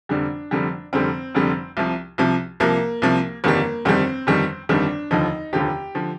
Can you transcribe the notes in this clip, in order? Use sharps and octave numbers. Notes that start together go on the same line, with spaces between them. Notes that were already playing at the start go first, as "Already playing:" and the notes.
F1 F2 D3 G3 D4
F1 F2 D3 G3
F1 F2 D3 G3 C4
F1 F2 D3 G3
C2 C3 F3
C2 C3 F3
C2 C3 F3 A#3
C2 C3 F3
G1 F2 D#3 G3 A#3
G1 F2 D#3 G3 C4
G1 F2 D#3 G3
G1 F2 D#3 G3 D4
F1 D#2 D3 F3 D#4
F1 D#2 D3 F3 G4
D3 F3